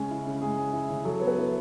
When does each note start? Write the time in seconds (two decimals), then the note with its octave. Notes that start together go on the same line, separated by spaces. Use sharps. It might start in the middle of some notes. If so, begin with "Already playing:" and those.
Already playing: C#3 G#3 C#4
0.11 E4
0.27 C#3
0.41 G#3 G#4
0.58 C#4
0.73 E4
0.90 C#3
1.05 F#3 A4
1.20 B3 C#5
1.27 B4
1.38 E4